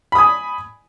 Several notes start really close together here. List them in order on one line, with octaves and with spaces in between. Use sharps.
B5 D#6 G#5